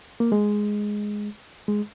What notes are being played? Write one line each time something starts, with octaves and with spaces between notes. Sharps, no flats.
A#3
G#3
G#3